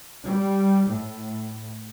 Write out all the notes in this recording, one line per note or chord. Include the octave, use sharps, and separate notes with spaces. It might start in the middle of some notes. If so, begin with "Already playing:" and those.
G3
A2